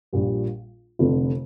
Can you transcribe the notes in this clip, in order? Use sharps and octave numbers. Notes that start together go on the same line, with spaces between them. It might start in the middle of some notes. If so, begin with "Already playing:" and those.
A#1 A#2 G3
F1 F2 D3